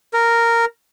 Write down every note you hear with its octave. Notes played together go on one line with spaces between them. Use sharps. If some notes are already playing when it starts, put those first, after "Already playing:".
A#4